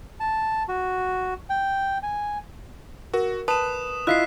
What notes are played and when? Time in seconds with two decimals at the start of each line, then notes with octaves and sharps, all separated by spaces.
0.20 A5
0.68 F#4
1.50 G5
2.03 G#5
3.14 F#4 A#4
3.48 B4 A5 D#6 E7
4.07 E4 F4 D#5 E6 F#6 B6 C7